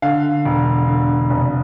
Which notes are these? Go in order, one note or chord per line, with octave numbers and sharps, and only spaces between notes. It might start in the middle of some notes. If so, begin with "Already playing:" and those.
D3 F5
E1
D3
F1